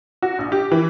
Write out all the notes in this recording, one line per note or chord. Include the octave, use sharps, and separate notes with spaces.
F#4
A#1
G4
E3